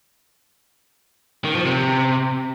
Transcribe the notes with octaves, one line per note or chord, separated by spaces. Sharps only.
D#3
F3
C3